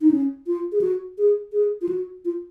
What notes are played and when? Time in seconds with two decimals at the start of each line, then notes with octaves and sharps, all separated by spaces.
0.01 D#4
0.11 C#4
0.47 F4
0.72 G#4
0.81 F#4
1.18 G#4
1.53 G#4
1.81 F4
1.89 F#4
2.25 F4